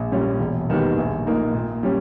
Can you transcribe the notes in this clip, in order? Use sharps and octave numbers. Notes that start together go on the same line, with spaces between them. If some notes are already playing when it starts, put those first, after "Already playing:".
Already playing: A#1
A#2 G3 C#4
E1
D#2 D#3 G3 B3
A#1
A#2 A#3 D#4
A#2
G3 C#4